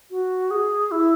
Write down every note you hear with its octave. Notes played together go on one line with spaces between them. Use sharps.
F#4
G#4
E4